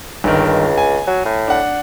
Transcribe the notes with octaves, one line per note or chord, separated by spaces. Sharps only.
G1 C#2 D#3
G#5
F#3
A2
D4 F#5